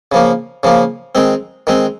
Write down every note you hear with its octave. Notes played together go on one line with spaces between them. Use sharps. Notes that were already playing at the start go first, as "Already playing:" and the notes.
C#3 F3 A#3
C#3 F3 A#3
D#3 G#3 C4
D#3 G#3 C4